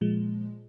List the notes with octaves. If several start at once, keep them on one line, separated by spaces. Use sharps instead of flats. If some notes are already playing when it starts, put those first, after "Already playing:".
A#2 F3 G#3